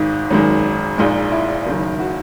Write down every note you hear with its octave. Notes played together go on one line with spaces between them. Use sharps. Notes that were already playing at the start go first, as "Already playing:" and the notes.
Already playing: G#1 G#2 D#3 G#3 D#4
G#1 F#2 D#3 G#3
A#1 A#2 G#3 D#4
E4
F#1 F#2 D#3
F#4